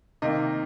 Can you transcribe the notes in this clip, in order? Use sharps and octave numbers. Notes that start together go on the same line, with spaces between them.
C3 D#3 A#3 D#5